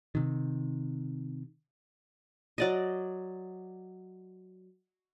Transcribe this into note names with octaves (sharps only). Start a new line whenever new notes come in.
C3 D#3
F#3 D5 D#5